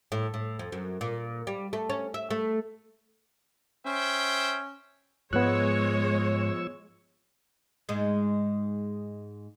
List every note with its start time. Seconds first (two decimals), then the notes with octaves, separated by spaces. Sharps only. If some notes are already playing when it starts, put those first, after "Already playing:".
0.12 A2
0.34 A2
0.59 F2
0.72 F#2
1.01 A#2
1.47 G3
1.73 A3
1.90 C#4
2.14 E5
2.31 A3
3.86 C#4 C5 E5 G5
5.33 G#2 F3 G#3 B3 C#5 C#6 E6 F#6
7.89 G#2 G#3